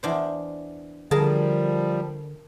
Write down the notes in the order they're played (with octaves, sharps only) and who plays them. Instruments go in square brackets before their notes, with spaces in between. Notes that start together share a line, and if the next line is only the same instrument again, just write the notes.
[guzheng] E2 D4 C5
[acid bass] D3 [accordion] F3 G3 [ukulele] G#4 [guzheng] A#4 A5